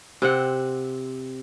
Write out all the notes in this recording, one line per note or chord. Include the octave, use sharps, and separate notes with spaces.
C3 C4 F#5